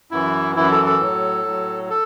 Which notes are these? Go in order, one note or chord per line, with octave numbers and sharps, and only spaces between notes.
F#2 E3 E4
F#2 E3 E4
A4
A4
A2 F#3
A2 F#3
A4